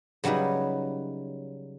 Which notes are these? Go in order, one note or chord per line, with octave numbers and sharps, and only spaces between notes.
C#3 F#3 G3 D#4 B4